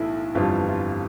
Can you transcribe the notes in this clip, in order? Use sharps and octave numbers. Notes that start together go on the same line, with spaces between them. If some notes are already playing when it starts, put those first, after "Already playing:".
Already playing: B1 A2 E3 A3 E4
G1 F2 E3 G3 F4
F4